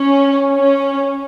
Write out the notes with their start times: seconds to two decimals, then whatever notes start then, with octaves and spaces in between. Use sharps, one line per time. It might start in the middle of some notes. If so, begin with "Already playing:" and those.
Already playing: C#4
0.55 C#4